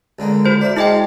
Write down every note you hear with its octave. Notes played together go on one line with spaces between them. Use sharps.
C#2 D3 A#3
F#4 C5 G6
D5 E5
G#3 E4 D#5 G5 C#6 D6